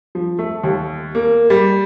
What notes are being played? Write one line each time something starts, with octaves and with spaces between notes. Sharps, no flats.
F3
A3
D#2
A#3
G3